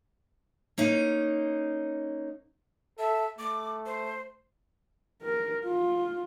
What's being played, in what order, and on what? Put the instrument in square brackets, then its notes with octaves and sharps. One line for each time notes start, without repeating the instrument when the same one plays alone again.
[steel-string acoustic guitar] A#3 C#4 D#4
[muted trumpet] A4 [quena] E5
[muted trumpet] A3 [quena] D6
[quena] C5
[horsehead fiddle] A#4
F4